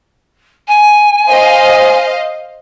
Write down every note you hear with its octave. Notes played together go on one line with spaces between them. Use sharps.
G#5
C5 D#5 F5